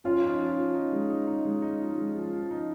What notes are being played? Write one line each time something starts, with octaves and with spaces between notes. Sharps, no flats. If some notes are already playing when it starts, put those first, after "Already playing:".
F3 C#4 F4
D#4
F3
F3
D#4
G#3
D#4
D#4
G#3
D#4
F3
G#3
F3
F3
D#4